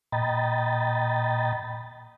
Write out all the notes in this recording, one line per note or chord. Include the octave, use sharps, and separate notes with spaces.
A#2 D#5 G5 A#5 B5 A6